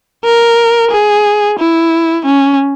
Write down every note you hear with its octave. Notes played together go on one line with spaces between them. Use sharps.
A#4
G#4
E4
C#4